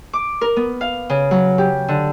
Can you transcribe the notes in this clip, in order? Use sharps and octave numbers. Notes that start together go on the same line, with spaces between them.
D6
A#4
B3
F5
C#3
F#3
G4
D3